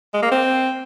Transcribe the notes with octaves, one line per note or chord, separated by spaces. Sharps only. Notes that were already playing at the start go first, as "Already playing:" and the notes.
G#3
A#3
C4